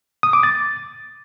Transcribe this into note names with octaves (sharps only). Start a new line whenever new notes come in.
D#6
D6
A6